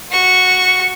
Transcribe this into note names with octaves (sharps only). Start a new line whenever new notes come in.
F#4 C#6